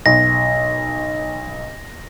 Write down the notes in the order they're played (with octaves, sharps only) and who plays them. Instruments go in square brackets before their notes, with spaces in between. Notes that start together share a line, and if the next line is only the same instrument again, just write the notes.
[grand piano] B1 [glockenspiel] A#6